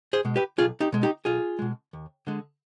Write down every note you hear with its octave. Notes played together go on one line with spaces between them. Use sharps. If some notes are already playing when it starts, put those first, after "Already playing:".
G#4 C5
B2 G#3
G4 B4
B1 F4 G#4
D#4 G4
B2 G#3
D#4 G4
B1 F4 G#4
B2 G#3
D#2
D3 G#3